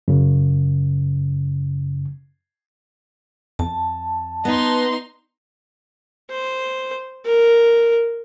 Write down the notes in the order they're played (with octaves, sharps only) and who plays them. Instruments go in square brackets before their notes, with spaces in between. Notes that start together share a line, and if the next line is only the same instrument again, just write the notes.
[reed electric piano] F#2 C#3
[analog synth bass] F2 [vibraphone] A5
[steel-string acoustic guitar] B3 [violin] D#4 C6
[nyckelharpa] C5
A#4